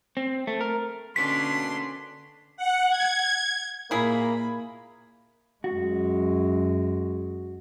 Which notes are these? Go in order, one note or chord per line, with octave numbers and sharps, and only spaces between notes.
C4
A3
A#4
B2 D3 A#3 C#4 D4 C6 B6
F#5
G#6
A#2 A#3 E4 G#4 B5
F#2 G#3 F#4